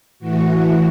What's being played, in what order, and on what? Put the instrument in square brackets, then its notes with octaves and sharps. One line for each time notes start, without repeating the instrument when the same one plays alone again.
[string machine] A2 E3 F#4